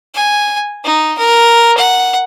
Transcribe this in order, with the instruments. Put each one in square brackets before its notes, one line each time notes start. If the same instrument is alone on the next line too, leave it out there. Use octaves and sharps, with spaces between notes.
[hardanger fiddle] G#5
D#4
A#4
F#5